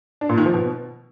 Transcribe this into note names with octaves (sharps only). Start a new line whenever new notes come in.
D4
A#2
D#3
F3
B2